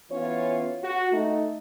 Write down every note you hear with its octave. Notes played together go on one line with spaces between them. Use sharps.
E3 B3 C#4 F4 C#5
F#4
A3 D#4